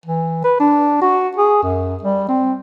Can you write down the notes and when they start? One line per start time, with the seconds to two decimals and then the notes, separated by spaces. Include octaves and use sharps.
0.06 E3
0.44 B4
0.60 D4
1.01 F#4
1.36 G#4
1.62 F#2
2.03 G3
2.28 C4